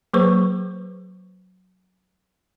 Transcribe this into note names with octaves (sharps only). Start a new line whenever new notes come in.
F#3 A#3 G#4 B4 C5 C#6